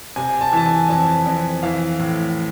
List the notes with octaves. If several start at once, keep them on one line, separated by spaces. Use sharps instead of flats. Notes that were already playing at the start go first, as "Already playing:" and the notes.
C3 G#5
A5
E3 A5
G#5
F2 A5
F2
E3 F5
A2